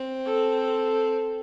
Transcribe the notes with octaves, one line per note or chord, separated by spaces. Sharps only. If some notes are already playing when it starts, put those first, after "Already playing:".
Already playing: C4
A4
A4